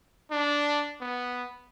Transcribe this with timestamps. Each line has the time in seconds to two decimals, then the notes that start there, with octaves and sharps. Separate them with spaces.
0.31 D4
1.01 B3